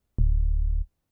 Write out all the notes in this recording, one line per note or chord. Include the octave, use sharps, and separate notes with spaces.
D1